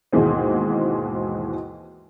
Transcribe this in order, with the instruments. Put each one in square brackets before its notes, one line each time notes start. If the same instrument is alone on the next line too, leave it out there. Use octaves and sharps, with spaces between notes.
[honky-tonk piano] D#2 G#2 B2 E3 G#3 C4